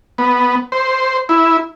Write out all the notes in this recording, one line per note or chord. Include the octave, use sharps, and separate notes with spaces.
B3
C5
E4